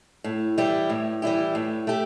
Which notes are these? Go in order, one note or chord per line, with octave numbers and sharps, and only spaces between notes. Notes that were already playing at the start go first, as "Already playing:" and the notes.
A2
E3 G3 E4 G4
A2
E3 G3 E4 G4
A2
A3 G4